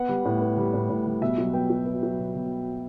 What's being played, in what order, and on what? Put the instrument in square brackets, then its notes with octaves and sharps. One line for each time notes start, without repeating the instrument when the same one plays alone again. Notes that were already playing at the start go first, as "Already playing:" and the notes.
Already playing: [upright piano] B3 F#5
G3
A2
B3
G3
A2
A2
G3
B2 E5
F#3
B3 G5
F#3
B3
F#3
B2
B2